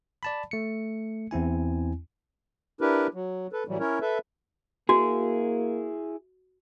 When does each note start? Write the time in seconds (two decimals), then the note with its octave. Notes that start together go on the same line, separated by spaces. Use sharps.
0.23 D5 A5 B5
0.51 A3 C#7
1.31 E2 C4 E4 G#5
2.81 D4 E4 G4 A#4 B4
3.14 F#3
3.52 A4 B4
3.68 A2 E3 F#3 G3
3.80 C#4 E4 A#4 C#5
4.01 A4 B4 E5
4.89 A#3 E4 F#4 G#4